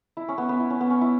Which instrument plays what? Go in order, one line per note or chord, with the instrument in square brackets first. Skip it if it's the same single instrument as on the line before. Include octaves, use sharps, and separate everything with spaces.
[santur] E4
C#4
B3
B3
E4
C#4
B3
C#4
E4